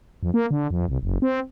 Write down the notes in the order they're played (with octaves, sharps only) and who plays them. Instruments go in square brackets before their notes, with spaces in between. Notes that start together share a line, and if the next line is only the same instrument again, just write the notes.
[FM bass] F2
A#3
D3
F2
C2
F#1
C4